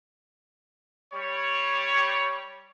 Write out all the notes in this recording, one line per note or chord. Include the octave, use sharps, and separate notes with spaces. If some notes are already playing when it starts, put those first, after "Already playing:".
G3 C#5